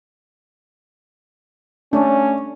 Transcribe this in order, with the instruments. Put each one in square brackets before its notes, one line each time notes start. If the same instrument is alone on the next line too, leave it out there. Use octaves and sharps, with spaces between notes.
[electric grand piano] A3 [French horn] C#4 [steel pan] D4